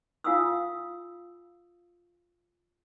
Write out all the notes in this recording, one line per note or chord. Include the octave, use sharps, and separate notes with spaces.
F4 F5 F#5 G#5 D#6 E6